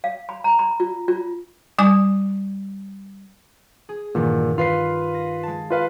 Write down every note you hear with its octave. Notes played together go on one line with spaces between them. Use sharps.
F5
B5
A#5
B5
F4
F4
G3 G#5 D6
G#4
E2 G2 A#2 D#3
F4 B4 F5 B5 C6 C7
A#6
G#3 A5
F4 B4 F5